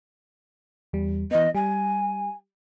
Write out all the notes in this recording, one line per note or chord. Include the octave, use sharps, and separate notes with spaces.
E2 G3
E3 B3 D#5
G3 G#5